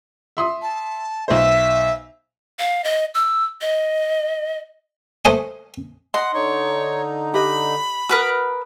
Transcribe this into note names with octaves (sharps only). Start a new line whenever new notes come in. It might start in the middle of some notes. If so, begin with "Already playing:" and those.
E5 C6 D#6
A5
B1 C5 E5
F5
D#5
E6
D#5
A3 C5 D#5 G#5
D#5 F#5 C6
D3 D#4 C#5
G4 B4 D#5 B5
F#4 A#4 B4 A#5 D#6